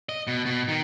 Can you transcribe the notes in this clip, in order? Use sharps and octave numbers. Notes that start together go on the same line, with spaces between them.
D#5
B2
B2
D#3